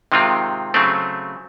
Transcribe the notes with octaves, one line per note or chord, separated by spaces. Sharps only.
C3 D#3 G#3 C4 F4
C#3 F#3 A3 C4